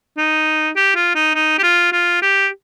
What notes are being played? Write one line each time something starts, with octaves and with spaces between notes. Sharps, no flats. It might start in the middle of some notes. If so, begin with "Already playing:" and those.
D#4
G4
F4
D#4
D#4
G4
F4
F4
G4